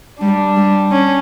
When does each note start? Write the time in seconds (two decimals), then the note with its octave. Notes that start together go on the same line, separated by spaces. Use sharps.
0.21 G3 D4
0.57 G3
0.91 C#4